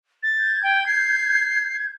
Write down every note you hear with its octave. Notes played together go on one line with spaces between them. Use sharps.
A6
G6 G#6
G5
C7